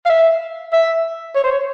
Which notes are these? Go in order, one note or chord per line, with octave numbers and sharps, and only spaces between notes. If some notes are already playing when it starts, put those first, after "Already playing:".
F5
E5
E5
C#5
C5
C#5